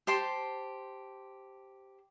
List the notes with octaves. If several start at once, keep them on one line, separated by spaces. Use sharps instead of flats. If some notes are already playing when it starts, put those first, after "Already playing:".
G4 C5 A5 C6